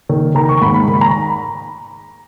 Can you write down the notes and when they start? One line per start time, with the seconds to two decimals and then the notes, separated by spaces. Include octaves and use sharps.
0.09 D#3
0.35 D#3 A#5
0.49 C#6
0.62 G#2 B5
0.74 B5
0.88 D#3 B5
1.01 A#5